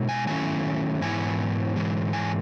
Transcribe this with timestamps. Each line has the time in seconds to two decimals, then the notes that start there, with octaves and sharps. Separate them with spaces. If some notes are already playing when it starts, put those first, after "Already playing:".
Already playing: B2 G#3 D#4
0.09 G#5
0.27 D#3 F#3 A3 C#4 E4 G#5
1.02 G#2 E3 B3 E4 G#5
1.76 G#2 E3 G#3
2.13 G#5